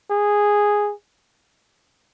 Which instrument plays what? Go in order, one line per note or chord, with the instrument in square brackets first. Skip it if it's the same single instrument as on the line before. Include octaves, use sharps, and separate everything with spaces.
[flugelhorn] G#4